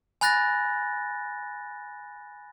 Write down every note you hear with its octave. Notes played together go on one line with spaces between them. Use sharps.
G#5 B5 F#6 A6 A#6